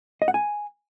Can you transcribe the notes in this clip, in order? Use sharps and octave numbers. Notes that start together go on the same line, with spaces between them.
D#5
F#5
G#5